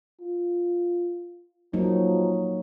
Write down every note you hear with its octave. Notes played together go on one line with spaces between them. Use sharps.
F4
F3 F#3 A#3 D#4